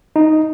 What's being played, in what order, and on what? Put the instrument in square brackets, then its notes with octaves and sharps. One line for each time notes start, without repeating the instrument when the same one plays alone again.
[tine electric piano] D#4